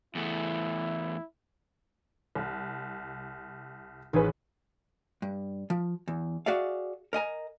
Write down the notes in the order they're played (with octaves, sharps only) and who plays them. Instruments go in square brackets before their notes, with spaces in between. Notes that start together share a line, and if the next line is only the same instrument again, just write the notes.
[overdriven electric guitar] E2 A3 [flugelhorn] E4
[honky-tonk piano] C2
[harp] A1 [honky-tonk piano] D#3 G#4 B4
[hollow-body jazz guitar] G2
F3
E2
F#4 G#4 D5 E5 F5
A#4 D#5 G#5 A#5